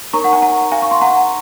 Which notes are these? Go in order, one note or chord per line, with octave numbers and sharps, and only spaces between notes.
D#4 A#4 C#5 A#5 C#6
F#5
G#5
F#5 A#5
F5 G#5
C#6
C6
F#5 A#5